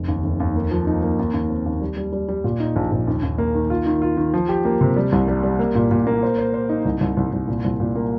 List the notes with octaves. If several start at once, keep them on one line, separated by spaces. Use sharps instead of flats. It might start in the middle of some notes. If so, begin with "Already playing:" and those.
Already playing: F1
D#2
F1
D#2
A#3
F3
D#4
A#3
D#2
D#2
C4
D#2
G3
G3
G3
G3
A#2
D#4
A#1
A#1
D#2
D#2
A#3
D#3
F4
D#3
F4
D#3
F3
G4
A#3
C3
G3
C2
G3
G3
A#3
A#2
A#2
A#3
C5
C5
C5
D#4
C2
C2
C2
C2
A#2
C2
A#2
A#3